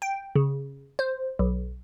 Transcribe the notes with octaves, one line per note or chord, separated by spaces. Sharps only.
G5
C#3
C5
B1